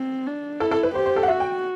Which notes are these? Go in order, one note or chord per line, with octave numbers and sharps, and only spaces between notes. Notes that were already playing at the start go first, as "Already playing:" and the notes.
Already playing: C4
D4
E4 A4
A4
B4
G4 C5
C5
A4
F#5
F#4 E5
G5